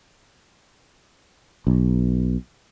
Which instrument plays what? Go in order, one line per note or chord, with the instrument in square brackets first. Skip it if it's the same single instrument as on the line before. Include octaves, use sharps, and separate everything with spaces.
[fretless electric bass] B1